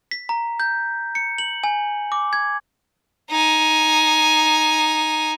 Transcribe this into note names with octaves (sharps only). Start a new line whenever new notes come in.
B6
A#5
G6
C#7
F#7
G#5
D6
G#6
D#4 G#5